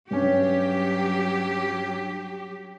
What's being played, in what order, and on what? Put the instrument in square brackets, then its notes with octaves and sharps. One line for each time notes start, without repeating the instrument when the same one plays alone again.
[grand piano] G2 C#4 [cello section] F#3 G4